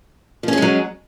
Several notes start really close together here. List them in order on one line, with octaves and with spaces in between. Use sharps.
F3 C#4 G#4 G#3 F#3